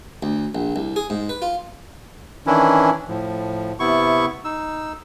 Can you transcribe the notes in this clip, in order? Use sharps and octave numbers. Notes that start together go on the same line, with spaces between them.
D2
A#1
C2
G#4
G#2
B4
F4
D#3 E3 C#4 D4 E4
A2 F3
C3 B3 E4 C#6
D#4 E6